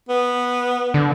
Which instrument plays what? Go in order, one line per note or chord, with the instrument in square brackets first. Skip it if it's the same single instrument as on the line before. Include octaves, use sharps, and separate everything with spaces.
[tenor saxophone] B3
[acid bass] D3